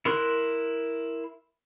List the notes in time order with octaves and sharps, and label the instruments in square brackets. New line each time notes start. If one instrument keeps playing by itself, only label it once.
[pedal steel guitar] E4 A#4 C6 F#6